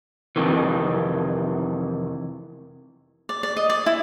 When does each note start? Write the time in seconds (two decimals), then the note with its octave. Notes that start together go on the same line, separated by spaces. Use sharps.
0.36 F2 C3 D#3 E3
3.29 D5
3.43 D5
3.57 D#5
3.70 D5
3.86 E4